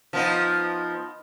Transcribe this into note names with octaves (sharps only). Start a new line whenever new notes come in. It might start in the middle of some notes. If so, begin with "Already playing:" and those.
F3 B3 D#4